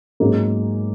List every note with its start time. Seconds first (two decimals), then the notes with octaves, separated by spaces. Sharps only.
0.20 G#2 F#3 A#3 C#4 G#4